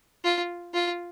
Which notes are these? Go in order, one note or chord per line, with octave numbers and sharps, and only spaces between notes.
F4
F4